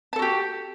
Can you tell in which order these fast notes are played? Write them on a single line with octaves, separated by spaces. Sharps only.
A5 A4 F#4 G4